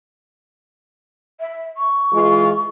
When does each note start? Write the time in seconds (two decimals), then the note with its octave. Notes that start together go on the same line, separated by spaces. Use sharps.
1.40 E5
1.77 C#6
2.13 E3 G#3 F4